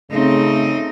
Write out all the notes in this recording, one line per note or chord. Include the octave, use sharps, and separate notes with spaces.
C#3 A3 C4 D#4